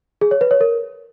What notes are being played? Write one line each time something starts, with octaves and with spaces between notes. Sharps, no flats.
G#4
C#5
B4
C#5
A#4